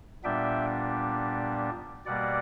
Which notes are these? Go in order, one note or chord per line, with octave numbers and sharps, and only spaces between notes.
A#2 G3 B3 D4 E5 G5
B2 G3 A#3 D5 F#5